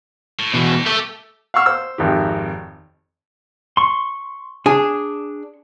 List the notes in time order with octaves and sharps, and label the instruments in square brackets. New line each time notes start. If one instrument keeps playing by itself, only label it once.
[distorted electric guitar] A2
[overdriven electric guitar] B2 E3
[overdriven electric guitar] A3 A4 [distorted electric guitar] G4
[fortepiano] F5 F#5 C#6 E6 F6
C5 E6
G#1 F2 D#3 G4
[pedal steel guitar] C6 C#6
[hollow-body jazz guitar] D4 G#4